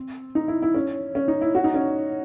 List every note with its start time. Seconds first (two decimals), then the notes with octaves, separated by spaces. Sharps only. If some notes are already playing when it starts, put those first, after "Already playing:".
Already playing: C4
0.35 D#4
0.48 E4
0.62 E4
0.75 C#4
1.15 C#4
1.28 D#4
1.41 E4
1.55 F#4
1.64 D#4
1.74 C#4